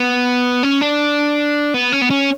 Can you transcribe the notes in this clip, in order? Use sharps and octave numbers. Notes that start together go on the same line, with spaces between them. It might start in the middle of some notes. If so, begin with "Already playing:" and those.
Already playing: B3
C#4
D4
B3
C#4
B3
C#4